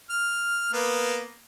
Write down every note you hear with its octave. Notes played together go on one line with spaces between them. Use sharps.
F6
A#3 B3